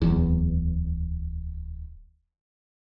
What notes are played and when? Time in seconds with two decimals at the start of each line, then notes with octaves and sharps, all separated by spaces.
0.02 D1 E2